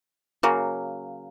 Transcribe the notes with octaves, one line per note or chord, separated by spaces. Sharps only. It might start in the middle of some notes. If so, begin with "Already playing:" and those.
C#3 F#3 A#3